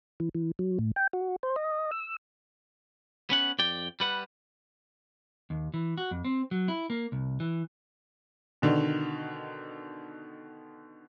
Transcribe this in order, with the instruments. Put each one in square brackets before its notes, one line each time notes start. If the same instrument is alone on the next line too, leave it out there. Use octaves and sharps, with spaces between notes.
[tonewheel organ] E3
E3
F#3
A2
G5
F#4
C5
D#5
E6
[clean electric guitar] B3 C#4 F#5
F2 D5 G5
G3 B4 F#5
D#2
E3
F#4
F2
C4
F#3
E4
A#3
C2
E3
[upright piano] B2 D3 D#3